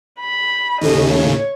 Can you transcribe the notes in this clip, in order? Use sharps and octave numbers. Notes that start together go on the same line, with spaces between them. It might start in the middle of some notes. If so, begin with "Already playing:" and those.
B5
D#2 A2 C#3 D#5
C#5